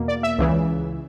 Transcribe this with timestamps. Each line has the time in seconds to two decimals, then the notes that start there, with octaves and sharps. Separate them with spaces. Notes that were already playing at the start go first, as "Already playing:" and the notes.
Already playing: E2 B2 A#3
0.08 D5
0.23 E5
0.38 C#2 C#3 E3